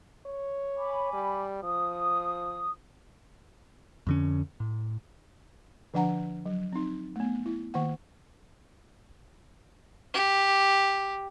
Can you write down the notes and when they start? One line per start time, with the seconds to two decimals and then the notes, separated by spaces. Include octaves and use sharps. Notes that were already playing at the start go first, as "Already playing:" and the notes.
0.26 C#5
0.77 G#5 B5 D6
1.13 G3
1.63 F3 D#6
4.07 F2 D3 C#4
4.60 A2
5.94 D3 F3 D4 F#5 A#5
6.46 F#3
6.72 C4 D#4
7.16 A3 B3
7.46 E4
7.74 D#3 A#3 F#5
10.14 G4